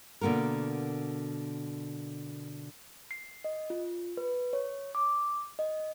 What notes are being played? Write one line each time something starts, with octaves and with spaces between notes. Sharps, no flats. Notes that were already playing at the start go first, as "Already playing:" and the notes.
B2 D3 A#3 F#4 A#4
C7
D#5
F4
B4
C#5
D6
D#5